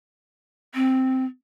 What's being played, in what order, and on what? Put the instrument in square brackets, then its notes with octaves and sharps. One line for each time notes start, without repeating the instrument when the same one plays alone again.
[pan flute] C4